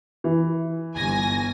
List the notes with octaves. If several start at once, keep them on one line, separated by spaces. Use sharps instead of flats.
E3
G1 G#5 A#6